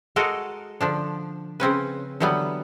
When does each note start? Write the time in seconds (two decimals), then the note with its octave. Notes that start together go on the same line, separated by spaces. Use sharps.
0.16 G#3 F#4 A4 A#4 D#5 F5
0.81 D3 F3 D4
1.60 C#3 C4 C#4 B4
2.20 D3 E3 F#3 G3 B3